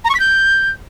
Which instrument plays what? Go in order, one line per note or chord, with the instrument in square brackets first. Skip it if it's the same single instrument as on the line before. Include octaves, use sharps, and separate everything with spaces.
[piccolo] A#5
C#6
B6
G6